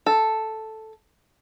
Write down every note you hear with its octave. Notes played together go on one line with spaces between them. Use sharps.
A4